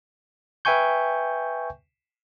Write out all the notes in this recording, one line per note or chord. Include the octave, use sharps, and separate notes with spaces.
B4 E5 G5 G#5 C#6 G6